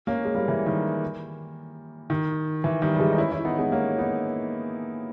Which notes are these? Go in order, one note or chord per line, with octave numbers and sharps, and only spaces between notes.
A#3 C#4
G#3
G3 A#3
E3
D#3 G3
D#3
E3
D#3 G3
G3
E3 G#3
D#4
C#4 E4
C#4 E4
B3 D#4
G#3 B3
A#3 C#4
B3 D#4